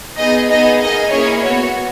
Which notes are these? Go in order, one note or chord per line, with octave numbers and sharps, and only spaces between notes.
B3 D#4 G#4 D#5
B3 D#4 G#4 D#5
A#3 D#4 G#4 D#5
A#3 C#4 E4 G#4 C#5
B3 F#4 C#5